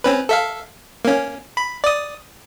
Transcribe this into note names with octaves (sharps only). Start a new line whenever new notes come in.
C4 C#4 B4
A4 E5 F5
A#3 C#4
B5
D5 D#6